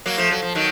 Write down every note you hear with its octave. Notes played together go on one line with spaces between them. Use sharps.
F#3 A#3
F3 A3
F#3
F3
D#3 F#3